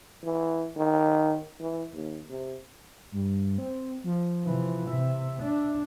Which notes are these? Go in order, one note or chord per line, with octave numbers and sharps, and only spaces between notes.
E3
D#3
E3
D#2
C3
G2
C4
F3
C3 E3
C3 E5
D4